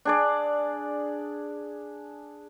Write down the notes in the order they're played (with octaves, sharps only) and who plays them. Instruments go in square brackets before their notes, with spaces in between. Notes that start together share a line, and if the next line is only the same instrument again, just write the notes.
[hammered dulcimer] D4 G#4 D5